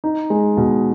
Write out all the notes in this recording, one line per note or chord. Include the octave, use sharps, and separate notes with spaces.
D#4
G#3
B2